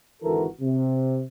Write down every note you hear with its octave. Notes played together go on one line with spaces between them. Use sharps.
G#1 D3 E3 F#4 A4 A#4
C3